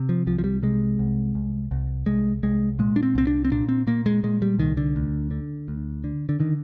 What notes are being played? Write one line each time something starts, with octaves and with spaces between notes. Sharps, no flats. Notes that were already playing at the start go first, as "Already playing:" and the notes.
Already playing: C3
F3
C2 F3
F3
G3
C3 G#3
C2
C2
C2
C2 G#3
C2 G#3
A#2 G#3
D4
C4
C2 C4
D4
C4
A#2 D4
C4
A#2 A#3
G#3
A#2 G#3
G3
C2 D#3
D3
D2
D3
D2
D3
D3
D3 D#3